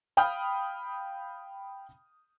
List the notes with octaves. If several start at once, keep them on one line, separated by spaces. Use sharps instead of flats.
F5 G5 B5 D#6 F6 G6